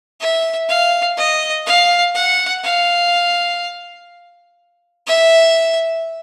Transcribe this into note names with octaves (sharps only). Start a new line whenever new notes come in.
E5
F5
D#5
F5
F#5
F5
E5